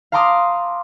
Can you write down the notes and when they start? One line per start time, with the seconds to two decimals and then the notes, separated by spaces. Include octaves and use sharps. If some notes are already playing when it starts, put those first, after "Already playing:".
0.12 F5 A5 A#5 C6 D6 D#6